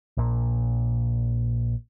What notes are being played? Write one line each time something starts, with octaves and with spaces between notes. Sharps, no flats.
A#1 A#2